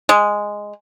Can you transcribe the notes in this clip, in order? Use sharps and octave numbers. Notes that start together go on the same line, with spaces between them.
G#3